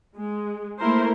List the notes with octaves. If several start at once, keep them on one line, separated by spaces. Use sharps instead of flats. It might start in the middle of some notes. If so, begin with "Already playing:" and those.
G#3
A3 A#3 E4 A#4 C5